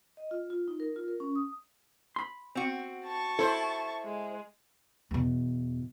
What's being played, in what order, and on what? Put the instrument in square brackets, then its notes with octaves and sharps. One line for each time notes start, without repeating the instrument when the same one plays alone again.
[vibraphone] D#5
F4
F4
D#4
A#4
F4
A#4
C#4
D#6
[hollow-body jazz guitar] B5 C6
[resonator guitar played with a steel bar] C4 F#4
[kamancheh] A5 C#6
[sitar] E4 C5 [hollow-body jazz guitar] A4
[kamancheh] G#3
[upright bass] E2 B2